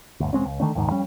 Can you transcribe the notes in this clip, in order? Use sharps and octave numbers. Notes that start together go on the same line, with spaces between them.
G1 D2
E1 G#3 C4 C#4
C#2
D3 D#3 A3 C#4
F#1 D#2 G#2 D#3
F2 G3 C#4